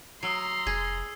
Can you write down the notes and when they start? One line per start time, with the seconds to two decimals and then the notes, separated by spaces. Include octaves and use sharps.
0.23 F#3 A#5 C6 D#6 E6 C7
0.67 F1 G#4